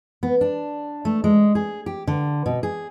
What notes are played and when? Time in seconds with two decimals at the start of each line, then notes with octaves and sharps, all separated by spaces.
0.23 B3
0.41 D4
1.05 A3
1.24 G#3
1.55 G#4
1.86 G4
2.07 D3
2.46 B2
2.63 G#4